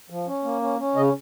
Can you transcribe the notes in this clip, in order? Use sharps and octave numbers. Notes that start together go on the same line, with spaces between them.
F3
C#4
A#3
C#4
C#4
C#3 D#5